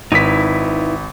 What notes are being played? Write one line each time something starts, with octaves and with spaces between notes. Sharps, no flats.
G#1 D#4 E4 B4 B6